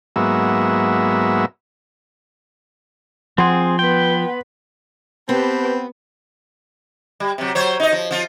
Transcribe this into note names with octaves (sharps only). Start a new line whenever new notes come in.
G#2 F#3 A#3 B3 E5
F3 C4 G#4 F#5 C6
B3 B4 G5
B3 C4 G4 B4 A5 B5
G3
C3 F#3
F#3 C5 C#5
D#4 D#5
F3
F3 F4